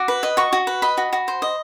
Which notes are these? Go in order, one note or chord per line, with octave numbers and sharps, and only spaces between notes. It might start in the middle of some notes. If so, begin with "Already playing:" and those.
Already playing: F#4 D6
B4
D#5
F#4 C#6
F#4
B4
D#5 B5
F#4
F#4
C5
D#5